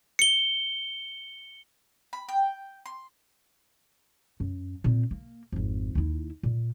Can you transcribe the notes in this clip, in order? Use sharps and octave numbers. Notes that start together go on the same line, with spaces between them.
C#7 G7
B5
G5
C6
F#2
A#2 C4
A#3
G#1 F2
D#2 E4
A#2